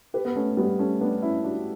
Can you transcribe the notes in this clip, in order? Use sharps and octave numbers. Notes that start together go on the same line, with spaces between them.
G4 B4
B3
A3 C#4
G3 B3
A3 C#4
B3 D4
C#4 E4
D4 F#4